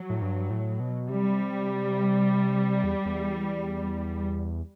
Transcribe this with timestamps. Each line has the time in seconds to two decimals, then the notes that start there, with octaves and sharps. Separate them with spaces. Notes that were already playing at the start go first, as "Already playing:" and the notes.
Already playing: F#3
0.10 A2
0.22 G2
0.50 A2
0.80 B2
1.09 C3 G3
2.84 E2
3.05 E2